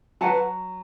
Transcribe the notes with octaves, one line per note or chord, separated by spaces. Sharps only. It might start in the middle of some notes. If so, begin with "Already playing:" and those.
F#3 B4 F#5 A5